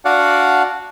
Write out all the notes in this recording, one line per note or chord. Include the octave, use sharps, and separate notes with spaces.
D4 F#4 D5 F5 F#5